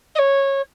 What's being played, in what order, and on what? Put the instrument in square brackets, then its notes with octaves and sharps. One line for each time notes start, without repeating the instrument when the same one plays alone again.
[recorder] D#5
C#5